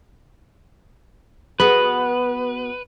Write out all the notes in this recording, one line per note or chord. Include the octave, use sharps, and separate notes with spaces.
B3 F#4 G#4 B4